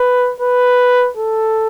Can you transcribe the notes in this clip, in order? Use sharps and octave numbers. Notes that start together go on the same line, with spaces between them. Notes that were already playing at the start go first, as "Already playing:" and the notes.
Already playing: B4
B4
A4